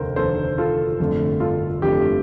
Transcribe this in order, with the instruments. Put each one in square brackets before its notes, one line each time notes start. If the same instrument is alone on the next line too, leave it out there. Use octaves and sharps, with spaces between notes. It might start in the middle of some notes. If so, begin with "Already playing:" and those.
Already playing: [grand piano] F1 D#2 D3 A#4 C5
F1 D#2 D3 A4 C5
F4 A4
G1 F2 D3 A3
F4 A4
G1 F2 D3 A3 G4